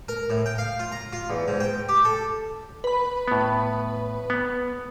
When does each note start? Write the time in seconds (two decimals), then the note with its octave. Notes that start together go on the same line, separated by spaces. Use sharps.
0.08 A#4
0.30 A2
0.46 G5
0.58 F5
0.79 F4
0.92 A#5
1.13 F4
1.30 E2
1.48 G#2
1.60 G5
1.89 G4
2.05 A4
2.84 B4 B5
3.28 A2 B3
4.30 B3